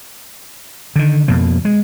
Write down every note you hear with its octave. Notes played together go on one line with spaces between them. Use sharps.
D3 D#3
F2 B2 A#3
G#3